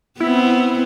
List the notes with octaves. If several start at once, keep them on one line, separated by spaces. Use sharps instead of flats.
B3 C4 E4